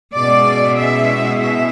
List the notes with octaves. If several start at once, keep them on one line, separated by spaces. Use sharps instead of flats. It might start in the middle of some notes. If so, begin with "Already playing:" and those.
B2 G#3 C#4 E4 D5
E5
E5